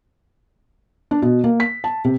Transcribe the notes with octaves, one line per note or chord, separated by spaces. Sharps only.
D4
B2
A#3
B6
A5
C3